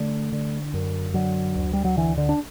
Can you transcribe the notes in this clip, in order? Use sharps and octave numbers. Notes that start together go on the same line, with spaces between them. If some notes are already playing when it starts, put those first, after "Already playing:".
Already playing: D3 A3
D3
F#2
D3 F#3
D2
G3
F#3
D3 E3
D3
D4